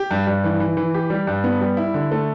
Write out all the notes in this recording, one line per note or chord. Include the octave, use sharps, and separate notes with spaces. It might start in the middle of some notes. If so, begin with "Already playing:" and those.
Already playing: G4
G2
G2
E3
E3
E3
G4
G3
G2
B3
G3
E4
D3
A3